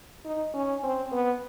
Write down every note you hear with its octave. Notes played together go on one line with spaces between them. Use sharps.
D#4
C#4
C4
B3